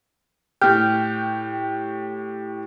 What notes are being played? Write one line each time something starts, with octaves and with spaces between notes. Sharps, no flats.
A2 G4 G5 F6 G6